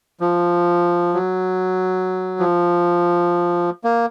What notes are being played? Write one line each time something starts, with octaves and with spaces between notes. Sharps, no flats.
F3
F#3
F3
A#3